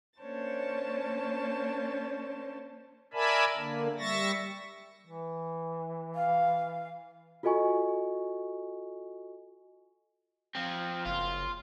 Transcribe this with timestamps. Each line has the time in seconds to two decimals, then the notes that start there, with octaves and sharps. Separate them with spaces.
0.19 A#3 C#4 D4 C5 C#5 A5
3.14 A#4 D5 E5 G#5 A5 B5
3.57 D3 A#3
3.99 G3 E5 C#6 A6 A#6
5.07 E3
6.15 F5
7.43 F4 F#4 A4 D#5 G#5 C#6
10.55 F3 C4
11.06 F#1 F4